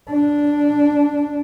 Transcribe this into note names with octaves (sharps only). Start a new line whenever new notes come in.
D4